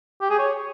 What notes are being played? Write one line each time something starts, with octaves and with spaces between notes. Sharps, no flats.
G4
G#4
C#5